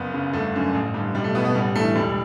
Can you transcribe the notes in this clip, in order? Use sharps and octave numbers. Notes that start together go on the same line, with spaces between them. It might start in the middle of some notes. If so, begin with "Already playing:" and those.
Already playing: F#1 B3
F#2 C#3
G1 A3
F#2 D3
A1
G2 D3
B1 G3
A3
B2 B3
B3
A1 G3
G2 E3 A3
E1 G3